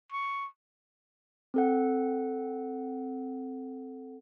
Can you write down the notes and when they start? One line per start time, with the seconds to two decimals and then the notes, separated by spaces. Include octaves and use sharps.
0.12 C#6
1.54 C4 A4 F#5